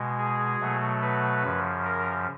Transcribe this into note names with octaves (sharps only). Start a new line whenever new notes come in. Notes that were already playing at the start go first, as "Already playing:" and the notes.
Already playing: B2 G#3
G#4
B2 F#3 A3
B4
F#2 C#3 F3
A#4